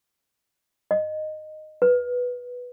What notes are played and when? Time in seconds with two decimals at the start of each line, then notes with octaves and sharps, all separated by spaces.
0.91 D#5
1.82 B4